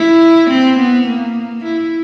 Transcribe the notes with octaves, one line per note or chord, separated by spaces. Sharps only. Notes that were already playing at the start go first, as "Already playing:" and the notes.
Already playing: E4
C4
B3
A#3
E4